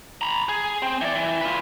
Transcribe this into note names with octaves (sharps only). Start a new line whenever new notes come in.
A#5 B5
G#4
C4
E3 D5
E3
F4 B4